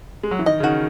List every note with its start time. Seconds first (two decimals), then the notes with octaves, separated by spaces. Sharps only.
0.23 G#3
0.31 F#3
0.39 E3
0.46 D#3 D#5
0.60 C#3
0.63 D#3 F#4